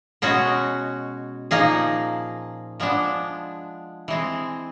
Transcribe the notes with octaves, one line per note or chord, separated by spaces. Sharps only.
B2 G#3 C#4 F#4
A#2 F3 A#3 D#4 G#4
F3 G#3 B3 D4
E3 G#3 C4